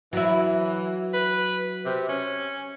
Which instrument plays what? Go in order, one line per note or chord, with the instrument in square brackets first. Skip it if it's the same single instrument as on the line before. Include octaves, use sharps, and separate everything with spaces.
[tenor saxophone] E3 [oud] F#3 E4
[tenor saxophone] B4
C3
C#4